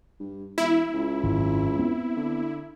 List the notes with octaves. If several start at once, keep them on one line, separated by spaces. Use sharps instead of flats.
G2
E1 E4
C#2
G#1 F#2
B3 C4
D3